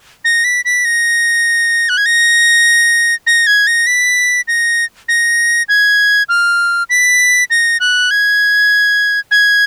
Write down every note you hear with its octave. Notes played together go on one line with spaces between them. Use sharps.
A#6
B6
B6
A#6
F#6
G#6
A#6
A#6
G#6
A#6
B6
A#6
A#6
G#6
F6
B6
A#6
F#6
G#6
G#6